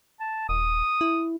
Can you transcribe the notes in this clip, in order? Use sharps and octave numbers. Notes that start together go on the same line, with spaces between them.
A5
D#1 D#6
E4